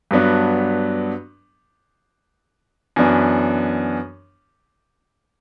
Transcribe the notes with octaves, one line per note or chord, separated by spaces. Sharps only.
G2 F#3 B3 D4
F#2 E3 B3 D4